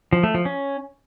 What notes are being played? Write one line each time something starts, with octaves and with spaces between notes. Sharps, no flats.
F3
A3
F3
C#4